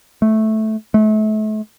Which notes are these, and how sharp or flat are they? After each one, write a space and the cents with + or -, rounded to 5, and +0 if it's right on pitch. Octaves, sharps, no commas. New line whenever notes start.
A3 -10
A3 -35